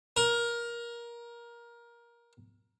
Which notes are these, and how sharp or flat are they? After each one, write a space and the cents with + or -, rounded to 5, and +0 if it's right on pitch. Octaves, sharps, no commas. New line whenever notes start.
A#4 +20